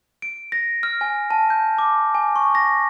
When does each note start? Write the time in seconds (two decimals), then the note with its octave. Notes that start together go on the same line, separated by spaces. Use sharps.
0.22 D7
0.52 A#6
0.83 F6
1.01 G#5
1.31 A5
1.50 G6
1.78 D6
2.15 G#5
2.36 C#6
2.55 A#6